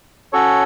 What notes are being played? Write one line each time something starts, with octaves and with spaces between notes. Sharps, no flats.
C#4 F#4 A4 C#5